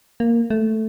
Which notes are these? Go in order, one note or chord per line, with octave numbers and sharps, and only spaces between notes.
A#3
A3